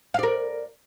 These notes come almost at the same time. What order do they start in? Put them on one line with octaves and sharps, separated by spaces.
F5 D5 A#4